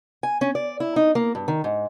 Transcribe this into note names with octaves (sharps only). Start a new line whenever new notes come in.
G#5
C#4
D5
E4
D#4
A#3
G2
D#3
G#2